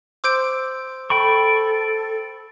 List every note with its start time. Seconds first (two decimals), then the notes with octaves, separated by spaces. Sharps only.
0.24 C5 C6 D6 E6 G6 D7
1.10 A4 G5 B5 C#6